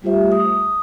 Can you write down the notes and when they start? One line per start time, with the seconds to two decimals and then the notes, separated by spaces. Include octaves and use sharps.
0.02 G3 A3 F4 G4 C5 E5
0.32 D#6